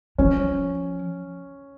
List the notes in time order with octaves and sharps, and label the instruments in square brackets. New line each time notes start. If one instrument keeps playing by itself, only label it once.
[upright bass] F3 [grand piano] C#4